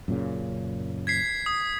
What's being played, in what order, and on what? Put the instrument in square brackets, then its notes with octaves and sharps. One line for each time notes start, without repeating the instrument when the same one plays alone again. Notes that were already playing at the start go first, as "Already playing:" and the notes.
[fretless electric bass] F#2 A#2 C#3
[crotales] G#6 B6 C7
D#6